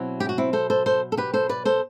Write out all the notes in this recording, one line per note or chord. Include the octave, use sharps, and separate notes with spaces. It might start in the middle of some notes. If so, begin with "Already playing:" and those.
Already playing: B2 F#3 C4 E4
G4
F#4
C4 E4
A4 C5
A4 C5
A4 C5
A4
G4 B4
A4 C5
B4 D5
A4 C5